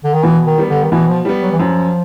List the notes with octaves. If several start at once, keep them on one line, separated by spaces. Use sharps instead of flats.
D3
D#3
B2 E3
D#3
G3 B3
D3
D#3
B2 E3
F3
G3 B3
F#3
E3
F#2 F3